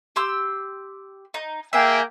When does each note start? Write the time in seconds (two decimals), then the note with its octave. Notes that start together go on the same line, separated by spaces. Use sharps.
0.16 G4 C6 E6
1.34 D#4
1.73 A#3 G#4 E5 G5